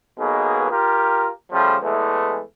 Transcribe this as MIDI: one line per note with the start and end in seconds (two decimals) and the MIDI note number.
0.19 0.70 35
0.19 0.70 47
0.19 0.70 58
0.19 0.70 68
0.71 1.30 65
0.71 1.30 67
0.71 1.30 70
1.52 1.76 49
1.52 1.76 53
1.52 1.76 55
1.52 1.76 57
1.82 2.42 40
1.82 2.42 52
1.82 2.42 56
1.82 2.42 57